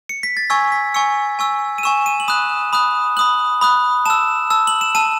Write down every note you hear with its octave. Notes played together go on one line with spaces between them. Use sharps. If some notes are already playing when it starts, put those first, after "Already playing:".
C#7
B6
A6
G#5 C#6 E6 G#6
B6
G#5 C#6 E6 C#7
G#5 C#6 E6
D#7
G#5 C#6 E6 E7
D#7
F#7
B5 D#6 F#6 E7
B5 D#6 F#6
B5 D#6 F#6 F#7
B5 D#6 F#6
A5 E6 E7
A5 E6
F#7
E7
A5 E6 D#7